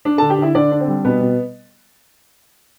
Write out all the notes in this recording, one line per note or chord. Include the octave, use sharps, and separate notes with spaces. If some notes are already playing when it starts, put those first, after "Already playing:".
D4
D3 A4 A5
G4 G5
D3 E4 E5
D3 D4 D5
D4
C4 C5
G3
B2 B3 B4
B2